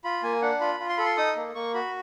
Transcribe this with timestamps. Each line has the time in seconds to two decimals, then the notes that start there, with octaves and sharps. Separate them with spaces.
0.04 F4 B5
0.23 A#3 G#5
0.42 D4 F#5
0.60 F4 B5
0.80 F4
0.89 C6
0.97 A4 B5
1.05 C6
1.17 D#4 D#6
1.36 A#3
1.55 A#3 C#6
1.74 F#4 B5